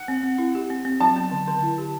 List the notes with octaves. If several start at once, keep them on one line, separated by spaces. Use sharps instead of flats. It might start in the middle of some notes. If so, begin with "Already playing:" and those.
Already playing: F#5
C4
C4
E4
G4
C4
C4
F#3 A5
B3
D3
D3
E4
G4